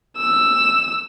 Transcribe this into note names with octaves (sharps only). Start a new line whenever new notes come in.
E6